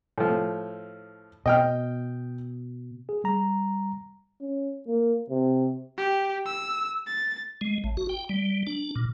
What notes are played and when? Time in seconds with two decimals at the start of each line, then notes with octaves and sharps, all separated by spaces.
0.18 A2 F3
1.46 B2 D#5 G5 F6
3.09 G#4
3.24 G3 A#5
4.41 C#4
4.88 A#3
5.30 C3
5.98 G4
6.46 E6
7.06 A6
7.61 G#3
7.84 A1
7.97 F#4
8.09 G5
8.29 G3
8.67 D4
8.96 A#2